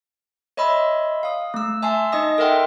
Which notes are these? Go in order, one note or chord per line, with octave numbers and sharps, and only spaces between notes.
C#5 D#5 E5 B5 C6 E6
F5 D#6
A3 E6
E5 G#5 A5 C6 E6 C7
D#4 D#5 D#6 A#6
A4 A#4 E5 F#5 G5 C6